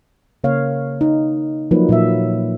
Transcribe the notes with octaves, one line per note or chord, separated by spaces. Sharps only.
C#3 A#3 C#5 F5
D#4
F3 F#3 A#3 D#4 B4
A#2 F#3 E5